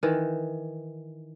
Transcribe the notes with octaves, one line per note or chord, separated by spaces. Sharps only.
D#3 E3